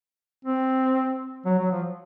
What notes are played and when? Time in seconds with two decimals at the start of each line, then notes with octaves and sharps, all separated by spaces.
0.45 C4
1.46 F#3
1.59 F#3
1.72 F3